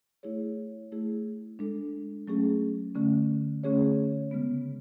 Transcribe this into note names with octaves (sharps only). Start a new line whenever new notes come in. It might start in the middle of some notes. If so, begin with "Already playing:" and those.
A3 E4 G#4 C#5
A3 E4 G#4
G#3 D4 A4
F#3 A3 C#4 G#4
D3 A3 C#4
D3 A3 C#4 G#4 C#5
C#3 G#3 B3